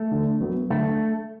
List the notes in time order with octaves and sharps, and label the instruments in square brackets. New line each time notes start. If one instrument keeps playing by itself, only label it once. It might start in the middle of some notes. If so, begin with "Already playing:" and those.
Already playing: [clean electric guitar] A3
[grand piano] D3
F#3 B3
[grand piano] D3 [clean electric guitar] A3